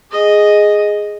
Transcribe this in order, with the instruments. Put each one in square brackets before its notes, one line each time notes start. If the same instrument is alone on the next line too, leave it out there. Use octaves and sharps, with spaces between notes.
[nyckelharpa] G#4 D#5